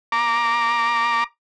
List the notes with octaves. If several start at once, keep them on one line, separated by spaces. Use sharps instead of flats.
A#5 D6